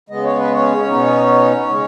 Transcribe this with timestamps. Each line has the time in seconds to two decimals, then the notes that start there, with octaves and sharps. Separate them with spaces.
0.09 C#3 G#3 B3 D#5
0.24 C#5
0.38 B4
0.51 C#4 C#5
0.89 B2 B3 D#4
1.69 C#3 G#3 D#4